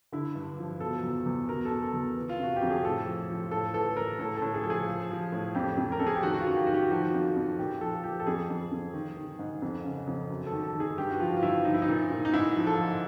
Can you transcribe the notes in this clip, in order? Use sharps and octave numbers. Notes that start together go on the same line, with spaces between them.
D3 E4
G2
F3
B2 A4
E2
E2
B2 A#4
A4
B2
A4
E2
E3
F4
C3 F#4
G4
F2
G#4
A2 A4
F3
F3
A2 A4
E3 A4
A2 A#4
A2 A4
A2 A4
G#4
F3 A4
G#4
F3
F3
A2
F2 G4
F2
A#4
F2 A4
G#4
G4
D#3 F#4
F#4
F4
F#2
G4
D#3 F#4
G4
F3 F#4
F2
F2
A#2 G4
F3 A4
F3 G4
A4
F2 G#4
F2
F2
D#3
D#3
G#2
F2
C#3
F2
F#2
A4
D#3
A4
D#3
G#4
G2 G4
F#4
F3 F4
F4
G2 E4
F3 D#4
E4
D#4
A#2
A#2
D#4
G#2 E4
F3
A4
F3